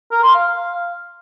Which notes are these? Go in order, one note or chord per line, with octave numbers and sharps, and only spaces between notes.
A#4
C6
F5